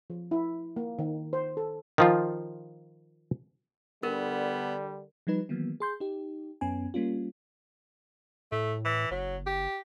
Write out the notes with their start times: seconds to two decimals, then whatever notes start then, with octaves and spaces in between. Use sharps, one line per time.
0.10 F3
0.31 E4
0.76 A#3
0.99 D#3
1.33 C5
1.57 A4
1.98 D#3 F3 F4
4.03 D3 G3 B3 A#4
5.27 F3 G3 D#4 B4
5.49 D#3 E3 F#3 A#3 B3
5.80 G#4 C6 G6
6.00 D#4 G4
6.61 F#2 B3 C#4 G#5
6.94 G3 A#3 C#4 F4
8.52 A2 A3
8.85 E3
9.11 F#1 F#3
9.46 G4